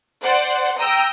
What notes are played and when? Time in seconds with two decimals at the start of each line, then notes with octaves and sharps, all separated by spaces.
0.23 C5 D5 F#5
0.79 G5 A#5 D#6 E6